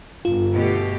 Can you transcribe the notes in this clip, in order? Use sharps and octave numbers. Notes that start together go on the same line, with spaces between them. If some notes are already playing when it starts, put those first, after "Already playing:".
G1 F4
B2 A3 G4